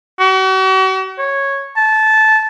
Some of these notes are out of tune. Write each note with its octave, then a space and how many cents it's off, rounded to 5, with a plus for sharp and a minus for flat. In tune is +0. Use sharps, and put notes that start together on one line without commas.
F#4 +40
C#5 -10
A5 -15